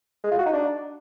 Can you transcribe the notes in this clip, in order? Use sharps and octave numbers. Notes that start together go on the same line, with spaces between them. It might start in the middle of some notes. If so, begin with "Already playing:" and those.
G#3
F4
F#4
D#4
D4